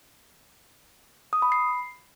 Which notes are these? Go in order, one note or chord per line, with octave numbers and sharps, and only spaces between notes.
D#6
B5
C7